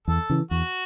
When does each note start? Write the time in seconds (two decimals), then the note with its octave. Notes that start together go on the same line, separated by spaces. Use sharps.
0.07 E2 A4
0.30 C#3 E3
0.51 E2 F#4